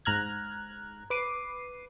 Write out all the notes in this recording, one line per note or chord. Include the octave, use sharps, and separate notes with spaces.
G#2 A#5 F6 F#6 G#6
B4 D6 C7 D#7